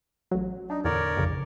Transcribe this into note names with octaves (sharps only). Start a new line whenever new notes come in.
A1 F#3
D4 D#4
E2 A2 D3 A#4 C#5 D5
A#1 F2 C#3